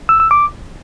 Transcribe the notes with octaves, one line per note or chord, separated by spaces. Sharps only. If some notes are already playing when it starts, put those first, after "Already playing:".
E6
E6
D6